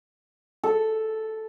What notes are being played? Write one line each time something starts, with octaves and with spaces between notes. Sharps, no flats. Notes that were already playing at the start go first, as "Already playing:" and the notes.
A4